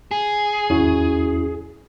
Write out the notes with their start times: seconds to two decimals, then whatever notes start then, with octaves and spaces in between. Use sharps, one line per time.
0.11 G#4
0.69 G#1 E2 C#4 E4 F#4